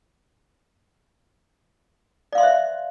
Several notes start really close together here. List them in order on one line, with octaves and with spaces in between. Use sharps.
D5 F5 C6 E5 C5